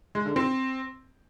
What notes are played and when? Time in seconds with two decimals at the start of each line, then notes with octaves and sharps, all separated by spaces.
0.15 G#3
0.25 D3
0.36 C4